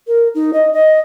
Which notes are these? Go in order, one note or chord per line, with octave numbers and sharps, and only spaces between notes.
A#4
D#4
D#5
D#5